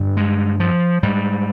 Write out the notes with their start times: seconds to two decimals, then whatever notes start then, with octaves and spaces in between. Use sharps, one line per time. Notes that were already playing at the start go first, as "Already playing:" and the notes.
Already playing: G2 D3
0.17 G#3
0.60 F3
1.03 G#2 G3